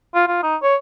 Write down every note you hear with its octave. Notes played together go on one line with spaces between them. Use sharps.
F4
F4
D#4
C#5